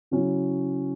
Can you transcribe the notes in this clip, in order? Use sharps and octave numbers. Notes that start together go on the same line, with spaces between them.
C#3 F#3 C#4 E4